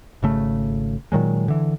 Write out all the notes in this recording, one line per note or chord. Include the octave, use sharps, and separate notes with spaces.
G#1 C#3 A3
A#2 D#3 F#3 G#3
D3 E3